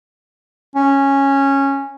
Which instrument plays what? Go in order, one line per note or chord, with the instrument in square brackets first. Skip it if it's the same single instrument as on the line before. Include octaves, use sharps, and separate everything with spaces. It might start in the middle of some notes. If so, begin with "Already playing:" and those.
[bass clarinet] C#4